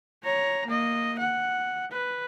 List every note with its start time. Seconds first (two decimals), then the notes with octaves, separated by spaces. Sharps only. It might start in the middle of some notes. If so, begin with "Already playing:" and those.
0.23 C#5 A#5
0.66 A#3 D#5
1.19 F#5
1.92 B4